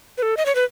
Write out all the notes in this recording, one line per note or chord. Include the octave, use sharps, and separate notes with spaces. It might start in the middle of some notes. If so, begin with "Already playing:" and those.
B4
A4
D#5
C#5
B4